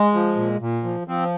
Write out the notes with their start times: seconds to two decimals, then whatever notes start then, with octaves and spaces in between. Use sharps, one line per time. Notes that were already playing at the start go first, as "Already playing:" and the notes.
Already playing: G#3
0.13 F3
0.36 A#2
0.60 A#2
0.84 F3
1.07 F3 C4